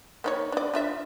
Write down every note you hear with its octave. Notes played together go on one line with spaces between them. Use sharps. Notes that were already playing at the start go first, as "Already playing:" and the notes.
A#3 D#4 C#5
D4 D5
D4 F4 E5